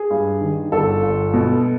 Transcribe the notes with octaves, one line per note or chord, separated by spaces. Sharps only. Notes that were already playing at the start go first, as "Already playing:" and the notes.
Already playing: G#4
G2
D#3
G1 A4
G1
B2